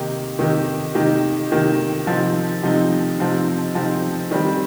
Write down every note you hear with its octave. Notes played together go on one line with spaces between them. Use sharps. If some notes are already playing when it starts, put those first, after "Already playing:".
Already playing: C3 D#3 A#3 D#4 G4
C3 D#3 A#3 D#4 G4
C3 D#3 A#3 D#4 G4
C3 D#3 A#3 D#4 G4
C3 F3 C4 D#4
C3 F3 C4 D#4
C3 F3 C4 D#4
C3 F3 C4 D#4
D#3 G3 C4